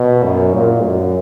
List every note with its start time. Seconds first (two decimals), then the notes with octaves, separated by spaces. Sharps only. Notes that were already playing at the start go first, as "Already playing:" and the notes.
Already playing: B2
0.23 F#2
0.54 A#2
0.84 F#2